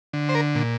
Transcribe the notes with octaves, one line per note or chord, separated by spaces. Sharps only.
D3
C5
A#4
A#2